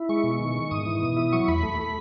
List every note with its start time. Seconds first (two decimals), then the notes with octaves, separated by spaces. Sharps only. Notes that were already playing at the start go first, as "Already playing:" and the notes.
Already playing: E4
0.09 G#3 C#6
0.24 B2
0.39 D#3
0.56 D#3
0.71 G#2 D#6
0.86 E3
1.01 B2
1.17 E4
1.32 F#3 C#6
1.48 E2 B5
1.63 A3
1.79 A3